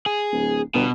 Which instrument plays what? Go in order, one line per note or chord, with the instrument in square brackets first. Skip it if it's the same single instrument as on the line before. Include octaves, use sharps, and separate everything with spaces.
[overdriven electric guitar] G#4
[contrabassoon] D1
[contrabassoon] G1 [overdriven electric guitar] B2